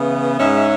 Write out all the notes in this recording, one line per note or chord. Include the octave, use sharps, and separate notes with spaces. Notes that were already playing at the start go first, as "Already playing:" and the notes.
Already playing: C#3 E3 B3
G#2 G#3 C#4 E5
E5